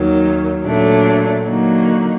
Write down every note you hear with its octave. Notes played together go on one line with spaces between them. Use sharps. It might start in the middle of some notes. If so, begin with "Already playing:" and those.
Already playing: D#2 D#3 F#3
A#2 F#3 A3 D4
D3 F#3 A#3 D#4 F#4